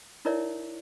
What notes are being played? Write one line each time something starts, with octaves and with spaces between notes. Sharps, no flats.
D#4 E4 A#4 C#5 D5 E5